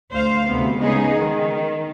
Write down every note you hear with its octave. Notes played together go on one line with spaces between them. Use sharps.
D2 C5 F5
D2 C3 B3
C#3 G#3 B3 D#4 G#4
D#3